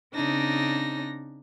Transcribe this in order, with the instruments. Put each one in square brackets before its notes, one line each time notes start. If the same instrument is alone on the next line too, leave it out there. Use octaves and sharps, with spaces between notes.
[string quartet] C#3 C4 D4 D#4 A#6